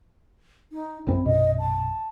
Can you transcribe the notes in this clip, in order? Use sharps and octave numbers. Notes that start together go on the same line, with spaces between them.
D#4
A#1 F#2 C4 E4
A#1 F#2 B2 D#5
A5